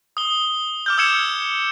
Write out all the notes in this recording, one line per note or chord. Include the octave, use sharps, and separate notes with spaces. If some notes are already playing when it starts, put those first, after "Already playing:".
D#6 G7
D6 F6 G6
D#6 E6 G#6 C#7 E7